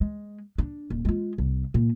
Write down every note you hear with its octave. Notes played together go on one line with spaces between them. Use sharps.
G#3
D4
D#1
G#3 F4
C2
A#2